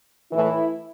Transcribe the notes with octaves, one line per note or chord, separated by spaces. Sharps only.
A2 E3 E4